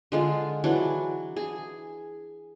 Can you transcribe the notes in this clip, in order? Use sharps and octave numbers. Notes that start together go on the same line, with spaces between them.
D3 G#3 F4
E3 F#3 D4
G#4